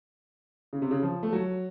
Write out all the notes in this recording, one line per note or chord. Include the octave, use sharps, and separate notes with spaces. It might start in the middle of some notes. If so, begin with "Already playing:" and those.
C#3
C3
C#3
F3
A3
F#3